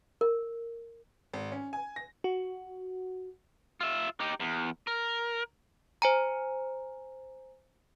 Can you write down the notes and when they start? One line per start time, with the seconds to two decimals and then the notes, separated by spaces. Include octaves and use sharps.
0.21 A#4
1.33 G#1
1.52 C#4
1.73 G#5
1.96 A#6
2.24 F#4
3.81 F4 E5
4.20 D#4 G4
4.40 E2
4.87 A#4
6.02 C5 G#5 A#5